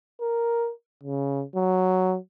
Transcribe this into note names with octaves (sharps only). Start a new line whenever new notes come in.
A#4
C#3
F#3